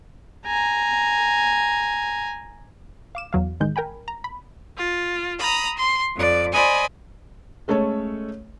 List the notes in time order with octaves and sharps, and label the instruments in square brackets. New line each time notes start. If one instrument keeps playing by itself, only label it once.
[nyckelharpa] G#5 A#5
[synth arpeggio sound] F5 D6 E7
E2 F#3 F5
A1 D#3 G#3 G6
A#4 G5 G#5 B5
A#5
B5
[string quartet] F4
A#5 B5 D#6
C6
F2 D5
C5 D5 D#5 G#5 B5
[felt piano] G#3 A3 C#4 A4 C#5